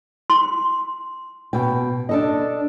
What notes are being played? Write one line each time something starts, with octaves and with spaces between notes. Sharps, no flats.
C6
B2 G5
D4 A4 D#5